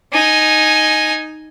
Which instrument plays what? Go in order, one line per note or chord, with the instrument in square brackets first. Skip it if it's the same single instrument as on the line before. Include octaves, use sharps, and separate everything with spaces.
[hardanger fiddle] D#4 G#5